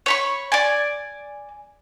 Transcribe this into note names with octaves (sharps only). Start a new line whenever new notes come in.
C#5 B5 C#6
D5 G#5